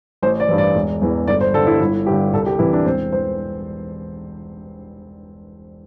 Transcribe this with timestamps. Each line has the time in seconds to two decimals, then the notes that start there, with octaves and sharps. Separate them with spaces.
0.22 A1 C5
0.40 D5
0.49 G2 E3
0.58 D5
0.75 E1
1.01 E2 E3
1.28 G1 D5
1.41 C5
1.54 G2 D3 A4
1.67 E4
1.80 G1 E4
2.06 G2 D3 G4
2.33 C2 A4
2.46 G4
2.59 C3 E3 E4
2.73 D4
2.86 E1 C4
3.12 E3 C5